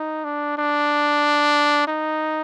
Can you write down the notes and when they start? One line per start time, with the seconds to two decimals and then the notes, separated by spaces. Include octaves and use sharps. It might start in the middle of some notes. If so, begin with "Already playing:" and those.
Already playing: D#4
0.24 D4
0.58 D4
1.87 D#4